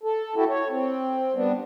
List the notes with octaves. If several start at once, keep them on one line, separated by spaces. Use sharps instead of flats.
A4
E4 F#4 G4 A4
C#5
C4
G3 B3 D4